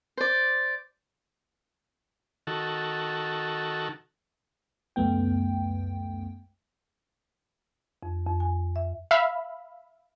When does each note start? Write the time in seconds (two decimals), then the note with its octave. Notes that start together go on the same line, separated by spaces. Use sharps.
0.17 C5 D5
2.47 D#3 F#4 A4
4.96 C#2 F#2 A3 B3 G5
8.03 F2
8.27 F2
8.40 G#5
8.76 E5
9.11 E5 F5 B5